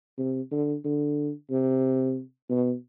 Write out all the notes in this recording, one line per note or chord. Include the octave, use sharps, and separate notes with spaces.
C3
D3
D3
C3
B2